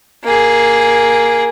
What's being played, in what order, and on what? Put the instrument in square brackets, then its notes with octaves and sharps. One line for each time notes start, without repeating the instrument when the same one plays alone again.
[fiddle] A#3 G#4